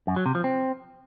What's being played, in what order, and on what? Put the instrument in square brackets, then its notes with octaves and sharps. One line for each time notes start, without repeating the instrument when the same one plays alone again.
[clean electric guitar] F#2
F#3
C3
F3
C4